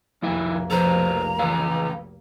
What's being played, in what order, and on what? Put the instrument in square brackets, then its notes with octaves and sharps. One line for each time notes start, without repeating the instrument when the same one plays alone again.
[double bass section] F1 B1 A#3 [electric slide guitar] F3 E4 E5
[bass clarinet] F3 [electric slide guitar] A4 B4 C5 [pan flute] A#5
[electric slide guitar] C#3 B4 F5 [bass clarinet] E3